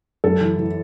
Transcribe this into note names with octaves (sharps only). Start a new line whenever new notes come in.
F#2 A4
E3
E3